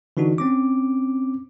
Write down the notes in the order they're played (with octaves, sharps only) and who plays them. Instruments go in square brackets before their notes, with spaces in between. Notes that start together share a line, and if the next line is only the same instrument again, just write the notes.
[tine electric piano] D3 E3 D4 D#4 F#4
C4 C#4 D6